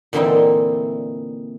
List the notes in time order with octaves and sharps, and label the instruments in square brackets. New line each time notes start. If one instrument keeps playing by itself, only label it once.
[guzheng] A#2 D3 E3 C4 D#4 E4